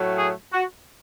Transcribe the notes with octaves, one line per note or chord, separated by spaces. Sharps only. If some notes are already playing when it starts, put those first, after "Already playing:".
Already playing: A2 F#3 A3
G#4
F#4